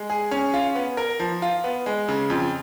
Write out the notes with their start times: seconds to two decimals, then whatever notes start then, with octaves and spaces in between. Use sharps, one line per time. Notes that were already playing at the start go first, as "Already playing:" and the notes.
Already playing: G#3
0.10 G#4
0.31 C#4
0.54 F4
0.75 B3
0.97 A#4
1.20 F3
1.42 F4
1.64 B3
1.86 G#3
2.08 C#3
2.30 F2